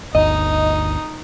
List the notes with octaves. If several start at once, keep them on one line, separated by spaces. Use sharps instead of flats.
G1 D2 D#4 D#5